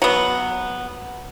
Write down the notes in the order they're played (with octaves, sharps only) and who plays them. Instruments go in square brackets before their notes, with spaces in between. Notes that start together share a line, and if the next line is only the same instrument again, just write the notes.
[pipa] F#3 B3